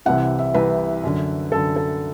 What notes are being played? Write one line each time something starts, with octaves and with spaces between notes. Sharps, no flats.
C2 C3 E3 F#5
E5
C2 C3 E3 B4
F#2 D3
F#2 D3 A4
A4